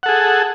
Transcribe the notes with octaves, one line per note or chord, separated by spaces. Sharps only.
G#4 A4 F#5